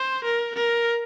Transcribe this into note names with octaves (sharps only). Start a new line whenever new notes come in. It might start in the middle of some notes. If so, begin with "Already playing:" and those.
Already playing: C5
A#4
A#4